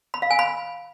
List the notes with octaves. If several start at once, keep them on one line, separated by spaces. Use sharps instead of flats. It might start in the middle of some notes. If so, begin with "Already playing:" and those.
B5
F5
G#5
B5